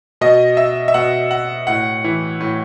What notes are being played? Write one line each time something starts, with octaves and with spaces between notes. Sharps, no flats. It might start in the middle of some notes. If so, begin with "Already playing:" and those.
B2 D#5
E5
E5
B2 F#5
F#5
A2 F#5
E3
A2